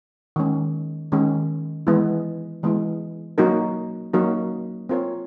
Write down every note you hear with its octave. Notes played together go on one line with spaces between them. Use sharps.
D#3 G#3 C#4
D#3 G#3 C#4
E3 G#3 B3 E4
E3 G#3 B3 E4
F#3 A#3 D#4 F#4 A#4
F#3 A#3 D#4 F#4 A#4
C4 F4 A#4 C#5